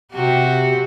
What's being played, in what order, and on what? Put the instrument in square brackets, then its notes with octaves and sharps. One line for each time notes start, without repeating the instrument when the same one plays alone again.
[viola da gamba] C3 F#4 G4